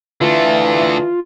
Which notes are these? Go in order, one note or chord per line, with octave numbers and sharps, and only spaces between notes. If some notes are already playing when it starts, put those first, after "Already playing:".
D3 E3 A3 F4